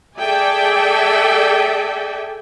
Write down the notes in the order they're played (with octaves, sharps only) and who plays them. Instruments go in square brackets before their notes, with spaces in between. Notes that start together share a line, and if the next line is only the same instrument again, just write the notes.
[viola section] G#4 A4 D5 E5 G5 G#5